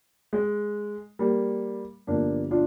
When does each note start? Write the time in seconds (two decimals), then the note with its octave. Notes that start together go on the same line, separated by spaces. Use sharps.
0.33 G#3
1.19 G3 A#3
2.07 G1 G2 F3 A#3 D4
2.51 D4 F4